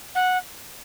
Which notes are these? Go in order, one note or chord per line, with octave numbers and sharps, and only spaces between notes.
F#5